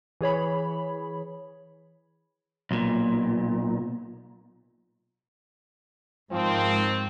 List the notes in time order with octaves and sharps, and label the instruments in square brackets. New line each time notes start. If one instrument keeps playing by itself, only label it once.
[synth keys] E3 G#4 C#5 B5
[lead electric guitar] B1 A#2
[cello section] G#2 [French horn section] D#3 C4 [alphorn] F3